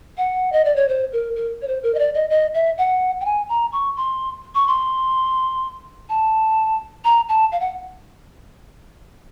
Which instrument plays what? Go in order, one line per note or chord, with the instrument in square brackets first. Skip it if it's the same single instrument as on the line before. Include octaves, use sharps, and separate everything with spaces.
[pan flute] F#5
D#5
D5
C#5
C5
A#4
A#4
C#5
C5
A#4
D#5
D5
D#5
D#5
E5
F#5
G5
G#5
A#5
C#6
C6
C#6
C6
A5
A#5
A5
F5
F#5